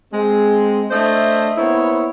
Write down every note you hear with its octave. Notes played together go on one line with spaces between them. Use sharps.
G#3 C4
A3 D4 C5 D#5 E5
A#3 B3 E4 C5 C#5 D#5